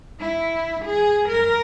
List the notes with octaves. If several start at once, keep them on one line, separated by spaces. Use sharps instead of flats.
E4
G#4
A#4